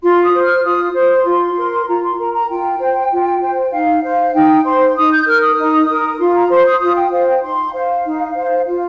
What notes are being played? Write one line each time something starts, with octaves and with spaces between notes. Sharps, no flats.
F4 C6
D#6
C5
F6
F4 D#6
C5 D#6
C6
F4
A#4
F4 A#5
C6
A#4 A#5
A#5
F4 G5
C5
F4
C5
D#4 F5
C5 F5
D#4 G5
C5 C6
C6
D#4 D#6
G6
A#4 F6
D#6
D#4
A#4
F4 C6
A#5
C5 C6
D#6
F4 D#6
G5
C5 F5
G5
D#4 C6
C5 F5
D#4
C5
F4 F5